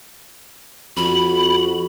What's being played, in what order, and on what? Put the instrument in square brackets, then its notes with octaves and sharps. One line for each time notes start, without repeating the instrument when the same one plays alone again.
[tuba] F2 [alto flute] F#4 [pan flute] B5